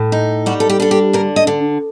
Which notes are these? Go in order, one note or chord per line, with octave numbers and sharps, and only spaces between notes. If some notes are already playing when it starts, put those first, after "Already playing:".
Already playing: A2
D#4
G3 F#4
A4
G4
D4 A4
G4
D3 A#4
D#5
D3